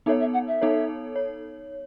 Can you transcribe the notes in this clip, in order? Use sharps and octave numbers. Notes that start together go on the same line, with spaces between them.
B3 D#4 A4 C#5 E5
E5
F#5
E5
B3 D#4 A4 C#5
C#5